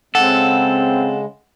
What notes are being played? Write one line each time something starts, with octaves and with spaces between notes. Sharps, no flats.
C#3 G#3 C4 A4 F#5